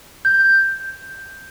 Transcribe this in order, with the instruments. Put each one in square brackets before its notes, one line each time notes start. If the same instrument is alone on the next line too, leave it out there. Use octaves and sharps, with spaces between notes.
[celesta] G6